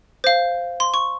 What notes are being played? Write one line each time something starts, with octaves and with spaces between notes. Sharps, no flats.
C5 F5
C6
C#6